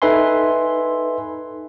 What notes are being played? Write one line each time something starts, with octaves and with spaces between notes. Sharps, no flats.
D#4 A4 B4 E5 G#5 C6